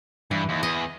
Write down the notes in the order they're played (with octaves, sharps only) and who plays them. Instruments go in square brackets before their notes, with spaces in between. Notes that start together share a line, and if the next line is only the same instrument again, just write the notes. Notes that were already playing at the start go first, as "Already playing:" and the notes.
[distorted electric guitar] G2 [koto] E3
[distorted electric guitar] D#2
[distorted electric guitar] E2 [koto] D#5